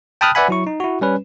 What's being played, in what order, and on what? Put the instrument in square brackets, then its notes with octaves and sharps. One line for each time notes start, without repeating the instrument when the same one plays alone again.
[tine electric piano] G5 A5 B5 D#6 F6 F#6
B4 D5 E5 F#5 G#5 B5
F#3 E4 C#6
D#4
E4 F#4
G3 C#4 B4